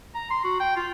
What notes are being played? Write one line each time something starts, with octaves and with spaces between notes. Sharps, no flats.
A#5
C6
F#4
G5
F4